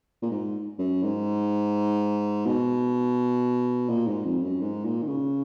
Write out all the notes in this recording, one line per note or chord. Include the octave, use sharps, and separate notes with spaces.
A#2
G#2
F#2
G#2
B2
A#2
G#2
F2
F#2
G#2
A#2
D#3
C#3